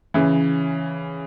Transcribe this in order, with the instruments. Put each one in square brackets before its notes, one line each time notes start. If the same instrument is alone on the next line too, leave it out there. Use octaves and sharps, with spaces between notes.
[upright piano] C#3 E3